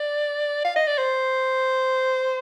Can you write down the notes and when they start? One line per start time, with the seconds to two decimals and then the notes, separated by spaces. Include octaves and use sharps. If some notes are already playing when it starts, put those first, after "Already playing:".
Already playing: D5
0.64 F5
0.76 D#5
0.87 D5
0.98 C5